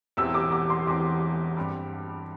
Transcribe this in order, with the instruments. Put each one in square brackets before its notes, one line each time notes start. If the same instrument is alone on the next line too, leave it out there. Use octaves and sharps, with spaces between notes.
[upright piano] E1 E2 E3 C4 [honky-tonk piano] E6
[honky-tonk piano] D6
D6
C6
[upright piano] E1 E2 E3 C4 [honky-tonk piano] D6
[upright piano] G2 G3 C4